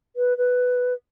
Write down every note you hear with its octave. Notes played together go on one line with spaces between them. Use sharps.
B4
B4